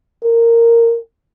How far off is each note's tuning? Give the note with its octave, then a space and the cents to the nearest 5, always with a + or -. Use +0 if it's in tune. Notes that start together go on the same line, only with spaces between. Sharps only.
A#4 -10